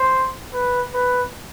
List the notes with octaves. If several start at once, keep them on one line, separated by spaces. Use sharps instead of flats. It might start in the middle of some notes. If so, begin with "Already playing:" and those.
Already playing: C5
B4
B4